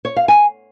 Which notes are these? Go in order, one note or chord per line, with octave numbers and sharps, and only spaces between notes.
C#5
F5
G#5